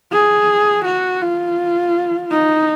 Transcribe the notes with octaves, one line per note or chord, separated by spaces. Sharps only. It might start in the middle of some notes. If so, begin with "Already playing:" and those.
G#4
F#4
F4
D#4